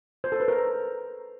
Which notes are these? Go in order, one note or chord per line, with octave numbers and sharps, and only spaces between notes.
C5
A4
B4
A#4